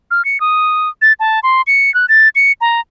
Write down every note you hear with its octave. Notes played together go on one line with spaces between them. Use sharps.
F6
C#7
D#6
A6
A5
C6
C#7
F#6
A6
C#7
A#5